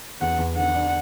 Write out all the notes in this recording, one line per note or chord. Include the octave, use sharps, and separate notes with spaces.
E2 F#5
E2
D3 F#5
D4